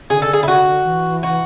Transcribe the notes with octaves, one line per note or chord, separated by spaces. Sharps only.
D3 G#4
A4
G#4
E4
F#4
E3
F#4